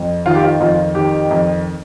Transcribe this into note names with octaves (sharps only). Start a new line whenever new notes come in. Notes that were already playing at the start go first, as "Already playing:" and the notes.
Already playing: F2
D#3 F4
G4
F4
F2 F4
D#3 G4
F2